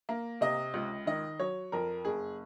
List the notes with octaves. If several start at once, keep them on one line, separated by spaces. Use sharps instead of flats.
A#3
C3 D#5
C#2
D#3 D#5
F#3 C#5
F2 A#4
F#1 G#4